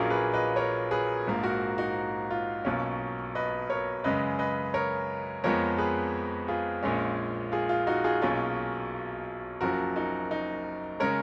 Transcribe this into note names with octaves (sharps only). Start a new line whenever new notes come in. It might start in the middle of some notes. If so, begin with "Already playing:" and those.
Already playing: A#1 A#2 F#3 A#3 C#4 F4 G#4
G#4 B4
B4 D#5
A#4 C#5
G#4 B4
A#1 G#2 F3 A#3
F#4 A#4
D#4 F#4
F4
B1 B2 A#3 C#4
B4 D#5
A#4 C#5
F#2 C#3 G#3 B4 D#5
B4 D#5
A#4 C#5
F2 F3 G#3 B3 A#4 C#5
G#4 B4
F4 G#4
A#1 A#2 G#3 C#4
F4 G#4
F4
D#4 F#4
F4 G#4
B1 B2 A#3 C#4 F4 G#4
F#1 F#2 F3 F#4 A#4
D#4 F#4
D#4
C#3 G#3 C#4 A#4 C#5